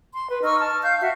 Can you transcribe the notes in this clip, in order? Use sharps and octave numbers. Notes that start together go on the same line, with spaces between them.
C6
B4
D#4 C#6 E6 F6
A5 F6
F5 G6
F#4 E5